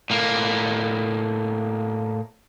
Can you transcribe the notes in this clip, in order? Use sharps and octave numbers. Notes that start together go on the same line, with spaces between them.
A2 A#3